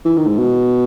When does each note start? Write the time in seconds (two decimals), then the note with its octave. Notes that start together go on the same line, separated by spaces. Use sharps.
0.05 E3
0.17 D#3
0.27 G#2
0.38 B2